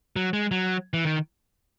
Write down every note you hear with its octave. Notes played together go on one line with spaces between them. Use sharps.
F#3
G#3
F#3
E3
D#3